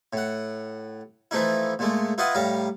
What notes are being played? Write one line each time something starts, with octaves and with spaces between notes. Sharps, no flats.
A2 F#5
E3 F3 A3 D#4 E4
A#2 G#3 A3
E4 F4 B4 D#5 F5 F#5
A2 G3 F5 A#5